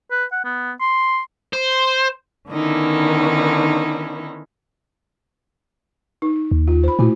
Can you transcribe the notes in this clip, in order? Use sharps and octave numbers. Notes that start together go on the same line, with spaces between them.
B4
F#5
B3
C6
C5
D3 D#3 B3 C#4 D#4 E4
D#4
D#2
F4
C5 B5
A#2 A3 E4 F#4